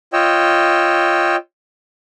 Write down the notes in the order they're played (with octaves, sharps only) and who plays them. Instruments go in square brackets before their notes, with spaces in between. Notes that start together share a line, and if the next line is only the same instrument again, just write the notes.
[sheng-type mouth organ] F4 C#5 D#5 G5 E6